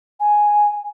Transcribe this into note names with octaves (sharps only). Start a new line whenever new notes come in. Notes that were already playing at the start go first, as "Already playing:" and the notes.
G#5